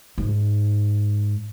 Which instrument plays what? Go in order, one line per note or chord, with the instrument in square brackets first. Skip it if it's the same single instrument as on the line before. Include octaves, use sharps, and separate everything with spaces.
[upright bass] G#2